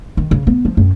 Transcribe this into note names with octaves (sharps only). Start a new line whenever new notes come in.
D#3
C#3
B3
F3
F#2